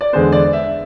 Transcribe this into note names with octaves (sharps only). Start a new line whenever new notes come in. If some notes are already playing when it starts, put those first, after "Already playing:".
D5
E2 D3 G#3 B3 C5
D5
E5